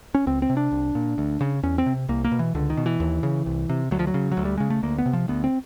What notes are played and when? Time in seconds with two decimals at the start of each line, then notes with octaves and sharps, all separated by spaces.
0.15 C#4
0.27 C#2 C4
0.42 C4
0.50 C3
0.57 D4
0.72 C2
0.95 A#2
1.18 D2
1.41 C#3
1.63 E2 C#4
1.78 C4
1.86 C3
2.08 C2 A#3
2.24 A#3
2.32 B2
2.39 E3
2.54 C#2 D3
2.70 D#3
2.77 B2
2.86 E3
3.00 D#2
3.23 C#3
3.46 C2
3.69 C3
3.91 D2 F#3
3.99 F3
4.07 F#3
4.14 C#3
4.32 F#3
4.37 D2
4.45 G3
4.58 C#3 G#3
4.70 A3
4.83 D2 A#3
4.98 B3
5.06 C3
5.13 F3
5.28 D2 B3
5.44 C4